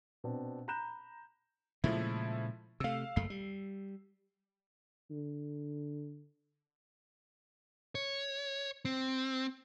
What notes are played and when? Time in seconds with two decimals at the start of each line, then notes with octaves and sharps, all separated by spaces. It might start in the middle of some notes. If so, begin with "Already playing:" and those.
0.24 B2 C4 D4
0.68 A#5 B5 F#6 G6 E7
1.84 A#2 C#3 F3 G#3 A3 E4
2.80 C3 A3 F5 E6
3.16 F#1 F#2 A3 C7
3.30 G3
5.11 D3
7.95 C#5
8.85 C4